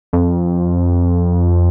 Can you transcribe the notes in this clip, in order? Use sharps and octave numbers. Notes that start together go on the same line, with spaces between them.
F2